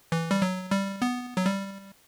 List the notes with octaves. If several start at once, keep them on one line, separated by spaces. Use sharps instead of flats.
E3
G3
F#3
G3
B3
F#3
G3